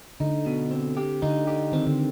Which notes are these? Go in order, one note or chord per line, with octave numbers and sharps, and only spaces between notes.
D3 D#4
B2
C4
G4
D3 D#4
G4
D#3 C4
D3